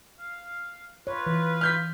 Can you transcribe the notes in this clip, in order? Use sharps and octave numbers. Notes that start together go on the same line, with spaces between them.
F5
F4 B4 C#5
E3
F6 G6 B6